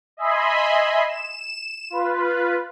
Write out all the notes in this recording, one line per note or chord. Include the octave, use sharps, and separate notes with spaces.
D#5 E5 G#5 B5 C6
E7
F4 B4